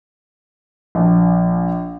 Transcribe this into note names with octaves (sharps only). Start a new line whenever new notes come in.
A#1